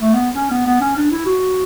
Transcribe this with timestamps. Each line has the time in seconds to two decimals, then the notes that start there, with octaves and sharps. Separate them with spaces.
0.01 A3
0.14 B3
0.35 C#4
0.51 B3
0.66 B3
0.81 C#4
0.96 D4
1.11 E4
1.26 F#4